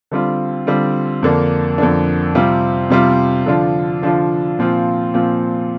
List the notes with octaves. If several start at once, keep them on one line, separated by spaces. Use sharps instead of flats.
D3 G3 C4 F4
D3 G3 C4 F4
F2 D3 A#3 D4
F2 D3 A#3 D4
C3 G3 C4 F4
C3 G3 C4 F4
D3 F3 D4 F4
D3 F3 D4 F4
A#2 F3 C4 F4
A#2 F3 C4 F4